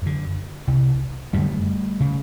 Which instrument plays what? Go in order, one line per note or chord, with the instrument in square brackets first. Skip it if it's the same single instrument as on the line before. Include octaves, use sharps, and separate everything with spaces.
[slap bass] F#2 D3
C2 C3
F#2 D3 G3 A3
C#3